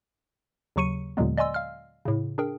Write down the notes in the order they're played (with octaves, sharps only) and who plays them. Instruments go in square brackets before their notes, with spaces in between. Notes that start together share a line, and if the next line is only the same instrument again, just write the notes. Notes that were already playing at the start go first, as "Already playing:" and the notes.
[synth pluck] D#2 C#3 F#3 C#6 C#7 D#7
D#2 A#2 D3 F#3 G#3 B3
D5 D#5 G#5 C6 E6
F5 F6
A2 C#3
D4 G#4 A#4 G5